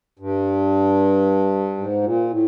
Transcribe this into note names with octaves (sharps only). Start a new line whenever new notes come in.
G2
G#2
A#2
A2